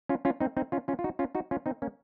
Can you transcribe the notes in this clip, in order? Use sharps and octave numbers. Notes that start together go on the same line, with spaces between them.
C#4 F4
C#4 F4
C4 D#4
C4 D#4
C#4 F4
C#4 F4
F4
D#4 F#4
C#4 F4
D#4 F#4
C#4 F4
C4 D#4
A#3 C#4